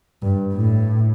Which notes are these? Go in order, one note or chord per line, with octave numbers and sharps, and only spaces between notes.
G2
A2